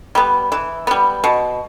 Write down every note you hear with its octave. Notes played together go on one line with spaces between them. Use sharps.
G3 B3
E3
G3 B3
B2